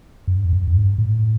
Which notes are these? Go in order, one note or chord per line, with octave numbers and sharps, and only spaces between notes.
F#2
G2
F2
F#2
F2
G#2
G2
A2